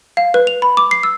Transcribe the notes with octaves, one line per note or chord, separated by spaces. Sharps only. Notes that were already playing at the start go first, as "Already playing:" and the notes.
F5
B4
F7
B5
D6
C7
E6